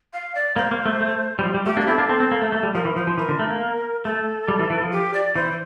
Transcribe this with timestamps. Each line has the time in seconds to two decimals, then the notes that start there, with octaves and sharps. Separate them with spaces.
0.13 F5
0.35 D5
0.56 A#3 C5
0.71 A#3
0.86 A3
1.01 A3
1.39 G3
1.43 F3
1.54 G3
1.66 A3 G4
1.77 A#3 D4
1.81 G4
1.87 C4 E4 A4
1.98 A#3 D4
2.09 C4
2.20 C4
2.31 A#3
2.41 A3
2.52 A3
2.63 G3
2.74 F3 A#4
2.85 E3
2.96 F3 C5
3.07 F3
3.18 E3 A#4
3.29 D3
3.39 A3
3.50 A#3
4.04 A3 A4
4.48 G3
4.59 E3
4.70 E3
4.82 F3
4.92 G4
5.14 D5
5.35 E3 C5